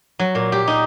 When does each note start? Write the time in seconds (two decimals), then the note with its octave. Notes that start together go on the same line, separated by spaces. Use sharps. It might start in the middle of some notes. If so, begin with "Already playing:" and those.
0.19 F#3
0.35 A#2
0.52 G4
0.67 D#4